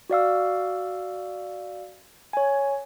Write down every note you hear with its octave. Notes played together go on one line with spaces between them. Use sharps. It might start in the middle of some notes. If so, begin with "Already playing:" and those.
F#4 D5 F5 E6
C#5 G#5